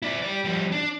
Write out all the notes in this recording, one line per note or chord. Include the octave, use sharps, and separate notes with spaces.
E4 D5
G4 D5
F3 G3
D4